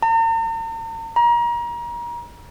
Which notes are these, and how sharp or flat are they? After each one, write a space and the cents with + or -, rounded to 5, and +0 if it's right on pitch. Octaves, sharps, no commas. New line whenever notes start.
A#5 -45
A#5 +30